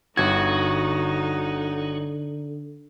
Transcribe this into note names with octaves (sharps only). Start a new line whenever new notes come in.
G1 D3 D#4 F#4 G#6